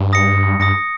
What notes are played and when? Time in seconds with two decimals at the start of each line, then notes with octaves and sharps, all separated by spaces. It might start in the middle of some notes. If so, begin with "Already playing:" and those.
Already playing: G2
0.13 D#6 A#6 C#7
0.59 G2 D#6 A#6 C#7